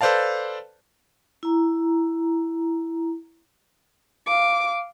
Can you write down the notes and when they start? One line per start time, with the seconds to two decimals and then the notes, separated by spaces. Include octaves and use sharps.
0.01 A4 B4 C5 D5 F5 A5
1.43 E4 A#5
4.26 F5 D6